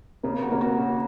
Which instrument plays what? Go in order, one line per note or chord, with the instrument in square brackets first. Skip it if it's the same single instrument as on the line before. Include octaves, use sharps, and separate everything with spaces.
[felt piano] C#3 [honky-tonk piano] A#3
[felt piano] F#4
[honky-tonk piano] A#3
[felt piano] F#4
C#3